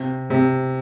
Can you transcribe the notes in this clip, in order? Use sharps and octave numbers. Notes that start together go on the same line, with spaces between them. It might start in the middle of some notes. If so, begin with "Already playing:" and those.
Already playing: C3
C3